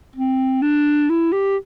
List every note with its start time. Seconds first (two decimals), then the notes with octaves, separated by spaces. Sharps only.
0.16 C4
0.62 D4
1.09 E4
1.32 G4